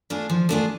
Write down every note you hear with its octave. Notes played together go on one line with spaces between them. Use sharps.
A3 D4 F4 G#4
F3
A3 D4 F4 G#4